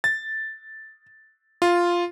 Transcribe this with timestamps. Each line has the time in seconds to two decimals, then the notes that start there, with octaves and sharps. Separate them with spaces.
0.04 A6
1.62 F4